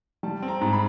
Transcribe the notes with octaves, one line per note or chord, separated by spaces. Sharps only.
G3 A5
C4
A#5
G#2
B5